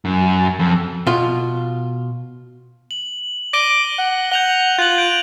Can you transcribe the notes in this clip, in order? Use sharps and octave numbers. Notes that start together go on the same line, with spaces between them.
F#2
F2
B2 F4
F#7
D6 A#6 D#7 G7
F#5
F#5 G6 F7 G7
F4 F#6 F#7
G6 D7